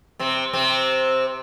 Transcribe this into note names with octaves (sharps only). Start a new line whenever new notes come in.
C3 C4
C3 C4